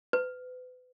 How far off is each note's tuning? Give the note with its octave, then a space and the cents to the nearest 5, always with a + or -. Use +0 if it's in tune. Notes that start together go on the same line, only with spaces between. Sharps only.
B4 +35